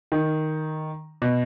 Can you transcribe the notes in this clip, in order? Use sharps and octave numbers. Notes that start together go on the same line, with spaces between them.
D#3
B2